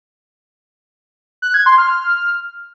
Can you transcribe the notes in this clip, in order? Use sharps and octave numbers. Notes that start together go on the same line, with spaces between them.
F#6
G#6
C6
F6